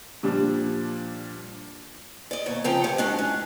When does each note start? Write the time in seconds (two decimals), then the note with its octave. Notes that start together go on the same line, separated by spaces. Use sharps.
0.23 A#2 F3 G3 D4
2.31 D5 D#5
2.46 D#2 B2 C#5
2.64 C#3 F3 C4 G5 A5 A#5
2.84 D2 G2 G3 C#5
2.98 G#3 D4 F#4
3.19 C#4